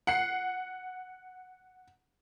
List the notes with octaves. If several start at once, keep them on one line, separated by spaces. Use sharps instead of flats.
F#5 C7